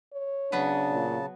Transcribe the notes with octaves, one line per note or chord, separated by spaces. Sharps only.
C#5
C#3 F#3 B3 D4 B4 A5
A#2